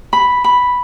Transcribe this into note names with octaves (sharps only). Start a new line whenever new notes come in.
B5
B5